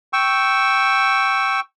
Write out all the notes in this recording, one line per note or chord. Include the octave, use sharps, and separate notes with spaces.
G5 C#6 E6